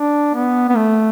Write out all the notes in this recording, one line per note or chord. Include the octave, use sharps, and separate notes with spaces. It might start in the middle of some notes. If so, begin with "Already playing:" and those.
Already playing: D4
B3
B3
A3